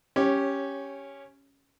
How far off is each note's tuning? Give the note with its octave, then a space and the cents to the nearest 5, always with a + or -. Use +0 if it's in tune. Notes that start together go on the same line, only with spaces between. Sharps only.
C#4 +0 G4 +0 C#5 -20